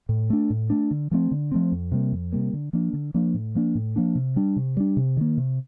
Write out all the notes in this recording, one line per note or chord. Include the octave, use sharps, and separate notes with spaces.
A2
A3 D4
A2
A3 D4
D3
F3 A3 C4
D3
F3 A3 C4
F2
C3 G3 A#3
F2
C3 G3 A#3
D3
F3 A#3 D4
D3
F3 A#3 D4
A2
F3 A#3 D4
A2
F3 A#3 D4
C3
G3 D4
C3
G3 D4
C3
D#3 A#3
C3